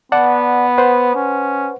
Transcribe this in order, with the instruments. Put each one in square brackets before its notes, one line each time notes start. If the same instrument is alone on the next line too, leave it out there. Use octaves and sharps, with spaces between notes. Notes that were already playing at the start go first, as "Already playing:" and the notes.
[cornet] B3 [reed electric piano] D5 F#5 A5
[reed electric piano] B4 C5 F#5
[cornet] C#4